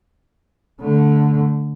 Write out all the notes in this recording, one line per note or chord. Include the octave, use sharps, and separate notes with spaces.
D3 A3